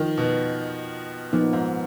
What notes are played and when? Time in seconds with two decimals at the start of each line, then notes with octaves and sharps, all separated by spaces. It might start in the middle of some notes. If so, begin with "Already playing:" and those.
Already playing: D#3 F3
0.18 B2
1.33 A#2 F3 B3 D#4
1.53 G#2